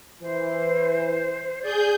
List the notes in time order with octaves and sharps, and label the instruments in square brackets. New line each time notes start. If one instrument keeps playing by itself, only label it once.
[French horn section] E3 [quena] C5
[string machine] G#4 G6 [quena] D5